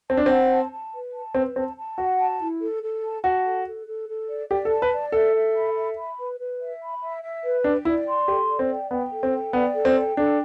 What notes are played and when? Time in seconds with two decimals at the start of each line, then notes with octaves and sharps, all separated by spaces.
0.10 C4 A5
0.17 D4
0.26 C4 F#5
0.51 A5
0.72 A5
0.93 B4
1.14 A5
1.35 C4 B4
1.56 C4 A5
1.77 A5
1.98 F#4 F#5
2.19 A5
2.40 E4
2.61 A4
2.81 A4
3.03 A5
3.23 F#4 A5
3.45 A4
3.66 A4
3.87 A4
4.08 A4
4.28 D5
4.50 G4 D5
4.65 A4
4.71 A5
4.82 B4
4.93 D5
5.12 A4 E5
5.34 E5
5.55 B5
5.76 E5
5.97 B5
6.18 B4
6.39 B4
6.60 E5
6.81 B5
7.01 E5
7.23 E5
7.44 B4
7.64 D4 G5
7.85 E4 D5
8.07 C6
8.28 G4 A4
8.49 D5
8.59 C4
8.70 G5
8.91 B3 G5
9.12 A4
9.23 C4
9.33 G5
9.53 B3 D5
9.75 A4
9.85 C4
9.96 G5
10.17 D4 A4